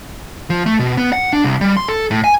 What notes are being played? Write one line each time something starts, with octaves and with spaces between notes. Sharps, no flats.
F3
A3
B2
B3
F#5
D4
C2
G3
C6
A4
A2
G#5